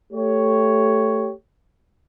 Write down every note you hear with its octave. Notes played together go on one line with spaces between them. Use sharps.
A3 G4 C#5